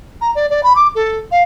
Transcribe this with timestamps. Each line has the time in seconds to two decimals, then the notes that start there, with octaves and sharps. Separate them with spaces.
0.21 A#5
0.35 D5
0.50 D5
0.63 B5
0.76 D6
0.95 A4
1.31 F5